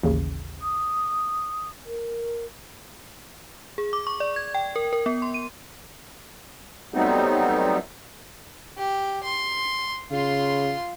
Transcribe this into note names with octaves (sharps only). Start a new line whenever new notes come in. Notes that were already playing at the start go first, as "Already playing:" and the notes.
A1 D#2 C#3
D#6
A#4
G#4
D6
C#6
D5
G#6
G5
A#4
A#4
B3
C6
D#7
F#3 G3 A3 B3 C4 D#4
G4
C6
C#3 F4 C6